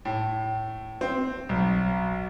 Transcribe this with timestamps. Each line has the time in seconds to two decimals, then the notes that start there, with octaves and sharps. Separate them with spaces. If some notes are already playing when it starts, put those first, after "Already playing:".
0.05 A2
1.01 C4
1.49 B1